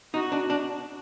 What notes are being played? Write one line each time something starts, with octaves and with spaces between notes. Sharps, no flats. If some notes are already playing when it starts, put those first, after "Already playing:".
D#4 F#4
D4
D4